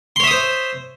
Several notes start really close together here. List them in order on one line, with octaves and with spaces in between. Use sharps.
C6 C#5 E5 D#6 C5